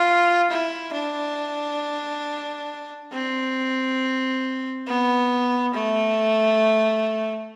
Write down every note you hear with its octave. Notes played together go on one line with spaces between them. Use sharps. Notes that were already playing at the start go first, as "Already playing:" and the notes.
Already playing: F4
E4
D4
C4
B3
A3